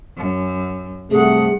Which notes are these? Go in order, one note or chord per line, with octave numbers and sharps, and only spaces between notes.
F#2
G2 C3 A3 G#4 F#5